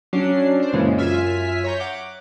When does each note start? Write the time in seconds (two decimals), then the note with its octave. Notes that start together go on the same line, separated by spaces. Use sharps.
0.13 F#3 C#4 D4 C7
0.60 D4 C5
0.73 F#2 A#2 C#3 E3 G#3
0.97 F#2 F4 E5 G#5 F6 B6
1.64 C#5 A#5 G6
1.80 F#5 D6